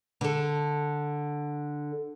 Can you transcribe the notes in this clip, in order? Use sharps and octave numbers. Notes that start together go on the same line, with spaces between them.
D3 A4